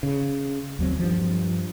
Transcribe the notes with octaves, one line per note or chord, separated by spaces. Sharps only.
C#3
D#2 F#3 C4
G2 F3